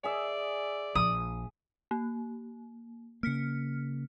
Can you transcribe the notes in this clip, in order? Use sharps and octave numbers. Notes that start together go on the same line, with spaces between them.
G#4 D5 E5
A#1 D#6
A#3
C#3 A#3 F6 B6 C#7